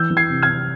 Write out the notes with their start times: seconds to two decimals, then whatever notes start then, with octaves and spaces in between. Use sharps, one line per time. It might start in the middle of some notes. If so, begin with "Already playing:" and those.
Already playing: E3 E6 G6
0.10 E3
0.17 G#6 C7
0.30 C3
0.42 F6 G#6
0.50 C3